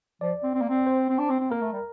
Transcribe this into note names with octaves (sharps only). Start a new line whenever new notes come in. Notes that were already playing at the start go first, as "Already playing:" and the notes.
F3 D5
C4
C4
A#3
C4
C5
C4
D4
C4
C4
A#3 A#4
A3
G3